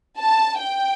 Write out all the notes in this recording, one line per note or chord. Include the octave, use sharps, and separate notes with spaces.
A5
G5